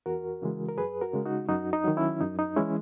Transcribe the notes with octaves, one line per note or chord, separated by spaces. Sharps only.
E2 F#4 A#4
C#3 E3 G#3
A#4
F#2 G#4 B4
F#4 A#4
C#3 G#3
D#4 F#4
F#2 D#4 F#4
D#4
D#3 F#3
C#4 E4
F#2 D#4
D#4
E3 G#3 C#4 E4